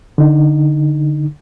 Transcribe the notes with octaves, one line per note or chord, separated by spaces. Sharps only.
D3 D#4